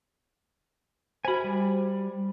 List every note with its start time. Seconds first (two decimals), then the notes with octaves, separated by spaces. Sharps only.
1.25 F#4 C5 G#5 B5
1.44 G3